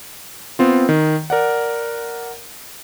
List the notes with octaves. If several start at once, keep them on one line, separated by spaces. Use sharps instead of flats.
B3 C4 F4
D#3
A#4 D5 F#5